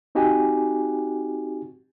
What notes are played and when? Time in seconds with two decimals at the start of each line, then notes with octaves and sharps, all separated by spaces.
0.15 C4 D#4 F#4 G4 G#5